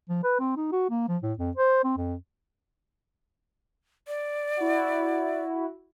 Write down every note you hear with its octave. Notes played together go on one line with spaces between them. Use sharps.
F3
B4
C4
D#4
F#4
A#3
F3
A2
F2
C5
C4
F2
D5
E4 F#4